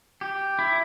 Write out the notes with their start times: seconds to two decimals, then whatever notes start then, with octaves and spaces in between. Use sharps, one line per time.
0.21 G4
0.59 E4